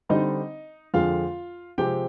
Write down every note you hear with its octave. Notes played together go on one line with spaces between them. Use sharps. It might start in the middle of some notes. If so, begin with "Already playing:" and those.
D3 G3 C4 D#4 D#5
F2 D3 F3 G#3 F4 F5
C3 F3 G#3 C4 G4 G5